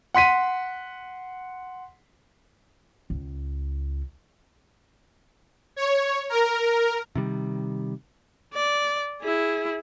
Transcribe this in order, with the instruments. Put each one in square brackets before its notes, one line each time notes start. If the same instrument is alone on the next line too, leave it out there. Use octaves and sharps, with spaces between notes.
[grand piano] F#5 C6 B6 D#7
[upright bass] C#2
[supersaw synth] C#5
A#4
[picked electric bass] C3 D#3 G3
[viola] D5
E4 G#4